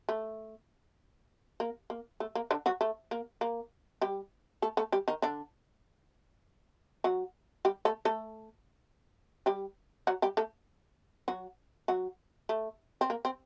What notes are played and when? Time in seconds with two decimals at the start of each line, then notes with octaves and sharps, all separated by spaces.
0.09 A3
1.60 A#3
1.90 A#3
2.20 A3
2.35 A#3
2.51 D3 D4
2.66 F#3 F#4
2.81 A3
3.11 A#3
3.41 A#3
4.01 G3 G4
4.62 A3 A4
4.77 A3 A4
4.92 G3 G4
5.08 D#3 D#4
5.22 D3 D4
7.04 F#3 F#4
7.65 G3 G4
7.85 A3 A4
8.05 A3 A4
9.46 G3 G4
10.07 F#3 F#4
10.22 G3 G4
10.37 A3 A4
11.28 F#3 F#4
11.88 F#3 F#4
12.49 A3
13.01 C4
13.10 A#3
13.25 C4